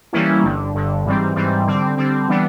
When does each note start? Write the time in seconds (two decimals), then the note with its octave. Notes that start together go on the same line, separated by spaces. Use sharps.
0.13 E3 G3 A#3 C#4 E4
0.43 G1 G2 D3
0.75 G1 G2 D3
1.05 G#2 E3 G3 C4
1.36 G#2 E3 G3 C4
1.67 D3 G3 C4
1.97 D3 G3 C4
2.29 E3 G3 B3 D4